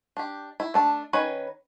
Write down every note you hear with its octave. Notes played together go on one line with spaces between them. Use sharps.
D4 G4
E4
A3 D4 A5
D#3 C#4 B4 C#5